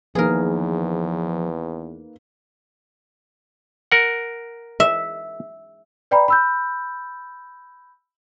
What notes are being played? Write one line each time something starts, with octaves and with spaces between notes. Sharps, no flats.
E2 D#3 F3 A#3 G#4 A#4 B4
A#4 F#5
E5
B4 D5 G5 A#5 B5
B5 E6 G6